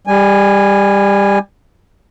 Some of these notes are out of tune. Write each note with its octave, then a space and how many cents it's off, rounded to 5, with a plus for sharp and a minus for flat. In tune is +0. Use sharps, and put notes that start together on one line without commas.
G3 +20 G#5 -10